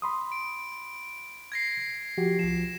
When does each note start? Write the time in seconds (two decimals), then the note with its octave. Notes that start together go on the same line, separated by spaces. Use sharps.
0.02 B5 C6 D#6
0.32 D7
1.52 G#6 A#6 C7
2.18 F3 F#4 G4
2.39 C2 F3 C7 E7